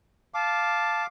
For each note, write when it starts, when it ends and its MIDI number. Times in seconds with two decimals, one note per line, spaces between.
0.34 1.07 77
0.34 1.03 81
0.34 1.07 86